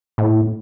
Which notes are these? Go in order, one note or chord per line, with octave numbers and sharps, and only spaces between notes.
A2